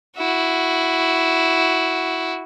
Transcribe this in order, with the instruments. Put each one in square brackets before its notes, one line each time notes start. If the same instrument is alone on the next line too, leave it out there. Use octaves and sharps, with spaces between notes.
[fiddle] E4 F#4